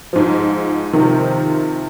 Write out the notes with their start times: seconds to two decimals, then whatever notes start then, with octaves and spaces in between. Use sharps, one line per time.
0.13 G#2 F3
0.93 C3 D#3 F3